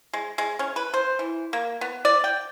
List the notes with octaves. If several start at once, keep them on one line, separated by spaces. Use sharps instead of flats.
G#3
G#3
C#4
B4
C5
E3
A#3
B3
D5
G5